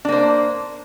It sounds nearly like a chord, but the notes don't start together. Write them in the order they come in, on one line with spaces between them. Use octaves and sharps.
D4 A#3 C5